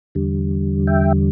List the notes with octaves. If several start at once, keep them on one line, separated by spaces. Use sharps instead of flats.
E2 D3 G3
E5 G5